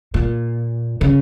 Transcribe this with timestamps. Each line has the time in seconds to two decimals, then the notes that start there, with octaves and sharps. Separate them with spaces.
0.14 A#2
1.01 C#3